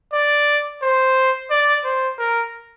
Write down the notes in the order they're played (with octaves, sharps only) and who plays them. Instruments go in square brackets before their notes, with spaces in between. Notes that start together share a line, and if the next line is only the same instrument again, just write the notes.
[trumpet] D5
C5
D5
C5
A#4